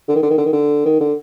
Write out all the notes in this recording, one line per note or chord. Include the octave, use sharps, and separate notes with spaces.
D3
D#3
D3
D#3
D3
D#3
D3
D#3
D3